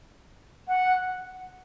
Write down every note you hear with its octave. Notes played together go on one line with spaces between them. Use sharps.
F#5